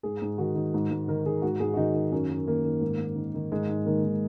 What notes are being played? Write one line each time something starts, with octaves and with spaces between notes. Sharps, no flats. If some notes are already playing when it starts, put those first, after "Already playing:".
G#2 G#4
G#2
D#3 F#4
D#3
G#2
G#2
D#3 A#4
D#3 G#4
G#2 F#4
G#2 G#4
F#4
D#3 D#4
D#3
F#2 C#4
F#2
D#3 A#3
D#3
G#2
G#2
D#3
D#3
G#2 G#3
G#2
D#3 A#3
D#3